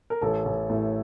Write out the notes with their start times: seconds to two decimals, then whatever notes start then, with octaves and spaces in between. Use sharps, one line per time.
0.10 A#4
0.21 A1 A4
0.45 A1
0.70 A2